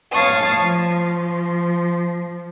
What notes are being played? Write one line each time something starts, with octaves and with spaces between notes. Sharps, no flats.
C#5 F5 A5 C#6 D#6
F3